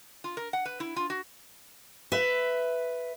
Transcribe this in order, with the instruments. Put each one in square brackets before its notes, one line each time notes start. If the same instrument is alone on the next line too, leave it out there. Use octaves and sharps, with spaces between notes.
[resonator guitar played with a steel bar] F4
A#4
F#5
B4
E4
F4
F#4
[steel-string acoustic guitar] B4 E5